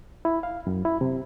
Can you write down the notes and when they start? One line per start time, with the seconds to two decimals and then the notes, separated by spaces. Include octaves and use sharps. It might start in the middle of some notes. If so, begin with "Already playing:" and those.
0.25 E4
0.43 F5
0.67 F#2
0.85 E4
1.01 C3